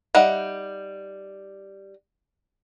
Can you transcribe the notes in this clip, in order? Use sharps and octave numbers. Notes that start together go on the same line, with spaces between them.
G3 D#4 E5 F#5